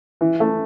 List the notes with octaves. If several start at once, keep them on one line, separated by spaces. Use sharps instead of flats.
E3
A3